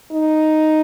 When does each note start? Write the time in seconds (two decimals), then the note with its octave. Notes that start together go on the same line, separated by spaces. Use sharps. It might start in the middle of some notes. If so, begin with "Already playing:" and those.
0.12 D#4